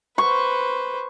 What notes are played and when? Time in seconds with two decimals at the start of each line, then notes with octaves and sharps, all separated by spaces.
0.18 B4 C5 C#6